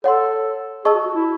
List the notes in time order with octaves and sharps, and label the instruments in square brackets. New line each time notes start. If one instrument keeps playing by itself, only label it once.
[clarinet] A4 [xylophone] C#5 F#5 C6
[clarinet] G#4 [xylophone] D#5 A5 C#6 E6
[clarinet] F#4
F#4
E4